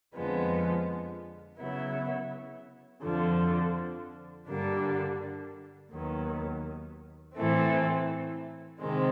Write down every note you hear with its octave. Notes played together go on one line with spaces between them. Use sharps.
F2 D3 F3 G#3 B3
C#3 F#3 B3 E4
F2 D3 F3
G2 D3 G3 A#3 D4
D#2 D#3 F#3 B3
A2 E3 A3 C4
C3 D#3 G#3 C4